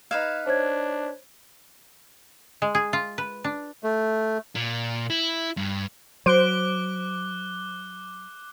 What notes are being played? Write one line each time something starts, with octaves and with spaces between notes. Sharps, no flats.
D#4 B4 F5 G#6 E7
D4 C5 C#5 G#6
G#3
G#4
F4
B4
D4
A3
A#2
E4
G2
F#3 C5 D6 F#6 D7 G7